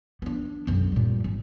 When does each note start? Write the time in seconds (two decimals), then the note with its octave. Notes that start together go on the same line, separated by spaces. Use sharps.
0.22 B3 D4
0.67 B1 F#2
0.92 A#2 G3
1.24 G#1